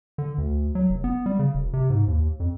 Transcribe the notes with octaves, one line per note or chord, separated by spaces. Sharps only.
D3
D2
F#3
F1
B3
G3
C#3
E1
C3
G#2
D#2
F2